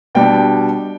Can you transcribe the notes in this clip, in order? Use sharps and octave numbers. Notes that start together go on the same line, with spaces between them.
B2 G3 D4 G5